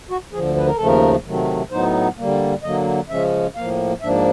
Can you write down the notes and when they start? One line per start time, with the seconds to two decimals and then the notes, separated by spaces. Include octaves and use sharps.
0.10 F#4
0.33 D2 D3 F3 G#4
0.56 B4
0.67 A#4
0.77 D#2 C#3 F3 A3 A4
0.86 A#4
1.25 C3 D#3 F#3 A3
1.71 A2 F#3 B3 D#4 C5
2.17 D3 G3 A#3
2.63 D3 F#3 A#3 D#5
3.09 C#3 F3 G#3 C#4 E5
3.56 A2 F3 A#3 F5
4.01 G#2 F3 A#3 D4 E5